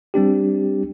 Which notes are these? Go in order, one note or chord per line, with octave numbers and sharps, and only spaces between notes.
G3 C4 D4 G4